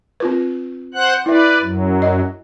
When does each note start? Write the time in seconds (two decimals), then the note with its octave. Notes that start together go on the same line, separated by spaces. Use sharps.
0.20 C4 F4 B4
0.94 C5 F#5 F#6
1.26 E4 B4 D5 E5
1.62 F#2 F#3
2.02 D#5